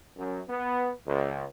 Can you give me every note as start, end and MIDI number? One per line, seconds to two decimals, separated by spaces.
0.17 0.40 42
0.48 0.91 59
1.07 1.46 37